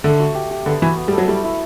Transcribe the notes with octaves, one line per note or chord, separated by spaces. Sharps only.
D3 A3
F#4
G4
G4
D3 B3
E3 F#4
B3
G3
A4
F#3
G3 E4
E4